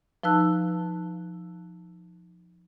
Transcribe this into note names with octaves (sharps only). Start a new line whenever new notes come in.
F3 D#4 B4 A5 E6 F#6